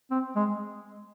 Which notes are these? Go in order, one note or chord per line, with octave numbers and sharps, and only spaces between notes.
C4
G#3